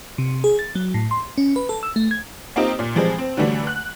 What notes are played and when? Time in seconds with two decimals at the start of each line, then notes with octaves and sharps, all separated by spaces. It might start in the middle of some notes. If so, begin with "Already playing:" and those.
0.18 C3
0.44 G#4
0.59 A6
0.75 F#3
0.94 A2
1.11 C6
1.38 C#4
1.56 B4
1.69 A4
1.83 E6
1.96 A3
2.11 G#6
2.56 A#3 C4 D#4 F4 G4
2.79 A#2
2.95 E3 F3 G3 G#3 C4
3.18 C4
3.37 D3 E3 F#3 G3 A3 D4
3.67 F#6